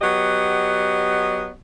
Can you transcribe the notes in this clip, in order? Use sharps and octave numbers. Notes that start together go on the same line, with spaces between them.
F#3 B3 G4 D#5